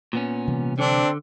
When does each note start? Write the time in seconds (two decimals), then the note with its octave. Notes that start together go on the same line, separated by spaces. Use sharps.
0.13 A#2 B3 C#4
0.47 C3 E3 G3
0.79 D3 C4 D4